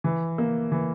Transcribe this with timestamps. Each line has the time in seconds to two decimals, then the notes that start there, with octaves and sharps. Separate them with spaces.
0.04 E3
0.38 A#3
0.72 E3